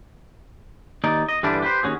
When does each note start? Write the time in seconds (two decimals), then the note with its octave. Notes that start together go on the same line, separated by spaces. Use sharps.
1.04 D#2 D#4 D5
1.29 D#5
1.43 G2 D3 E3 G3 D4
1.62 G4 B4 C5
1.83 D#2 C#4 F#4 G#4